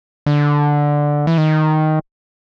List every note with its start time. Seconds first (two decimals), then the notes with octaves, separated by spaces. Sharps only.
0.26 D3
1.27 E3
1.38 D#3